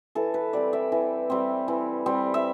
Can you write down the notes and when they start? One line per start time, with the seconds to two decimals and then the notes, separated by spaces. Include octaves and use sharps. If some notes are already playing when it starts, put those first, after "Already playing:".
0.15 E3 A4
0.34 B4
0.53 G3 C4 D5
0.73 E5
0.92 E3
1.30 G3 C4
1.68 E3
2.06 G3 C4
2.34 E5